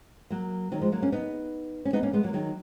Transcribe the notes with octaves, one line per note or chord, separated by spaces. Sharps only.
F#3 A#3
D#3 F#3
F3 G#3
F#3 A#3
A#3 C#4
B3 D#4
C#4
B3 D#4
A#3 C#4
G#3 B3
F#3 A#3
D#3 F#3